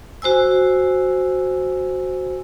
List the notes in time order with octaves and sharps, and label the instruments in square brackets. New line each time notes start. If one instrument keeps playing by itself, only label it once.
[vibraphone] F#4 C5 G#5 E6